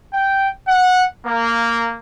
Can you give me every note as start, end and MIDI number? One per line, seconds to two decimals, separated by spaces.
0.13 0.47 79
0.68 1.03 78
1.26 1.97 58